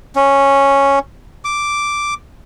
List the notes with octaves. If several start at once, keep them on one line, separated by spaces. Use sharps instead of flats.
C#4
D6